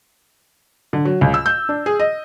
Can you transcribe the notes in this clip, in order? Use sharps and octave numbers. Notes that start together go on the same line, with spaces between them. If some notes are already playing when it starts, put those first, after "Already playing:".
D3
F#3
C#2
E6
G6
D4
G#4
D#5